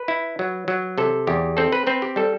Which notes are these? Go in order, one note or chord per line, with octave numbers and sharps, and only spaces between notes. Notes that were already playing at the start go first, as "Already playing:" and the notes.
Already playing: B4
E4
F#3
F#3
C3 A4
E2 G4
C4 A4
B4
C4 B4
G4
G3 A4